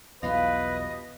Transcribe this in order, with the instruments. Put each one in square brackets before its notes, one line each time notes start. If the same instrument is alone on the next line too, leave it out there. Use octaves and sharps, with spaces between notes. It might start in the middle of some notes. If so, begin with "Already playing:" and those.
[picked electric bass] B1 E2 [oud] B2 G3 F4 [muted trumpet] B4 [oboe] D#5